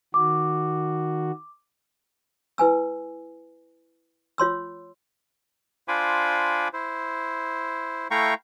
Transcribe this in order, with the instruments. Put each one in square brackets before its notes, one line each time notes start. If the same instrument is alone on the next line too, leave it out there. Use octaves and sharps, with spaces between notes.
[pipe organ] D#3 F#4 [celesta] D6
[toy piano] E4 B4 G#5 E6
F4 C#5 C6 E6
[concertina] D4 F4 C5 G#5 B5 D6
E4 C5
A3 E4 F5 G5 A#5 C#6